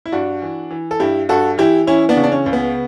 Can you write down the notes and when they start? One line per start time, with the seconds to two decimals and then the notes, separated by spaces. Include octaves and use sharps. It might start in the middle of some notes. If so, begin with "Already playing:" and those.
0.06 E4
0.12 G2 D4 F#4
0.42 E3
0.71 E3
0.91 A4
1.00 G2 E4 G4
1.29 G2 F#4 A4
1.58 E3 E4 G4
1.87 E3 C#4 E4
2.09 B3 D4
2.17 C#3
2.23 D4
2.32 C#4
2.46 C#2
2.53 B3